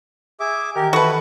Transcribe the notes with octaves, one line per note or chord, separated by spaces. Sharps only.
G#4 E5 D6
D#3 E3 G4 A#4
E4 F#4 A4 B4 A5 B5